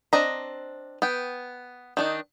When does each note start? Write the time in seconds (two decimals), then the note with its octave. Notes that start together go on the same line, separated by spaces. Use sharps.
0.13 C4 D4 D#5 A#5
1.02 B3 G5
1.97 D#3 D4 D#4